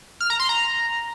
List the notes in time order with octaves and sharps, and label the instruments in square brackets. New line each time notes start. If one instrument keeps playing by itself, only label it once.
[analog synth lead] F6
A#5
C6
A#5